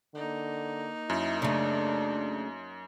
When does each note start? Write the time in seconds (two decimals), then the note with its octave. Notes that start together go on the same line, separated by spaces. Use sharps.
0.15 D3 A#3 D#4
1.10 F#2 E4
1.42 C#3 A3 D4